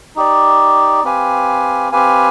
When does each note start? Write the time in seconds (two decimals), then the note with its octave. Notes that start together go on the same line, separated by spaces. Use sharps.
0.16 D#4 G4 D5
1.04 C4 G4 B4 F5 G#5
1.92 C4 G4 B4 F5 G#5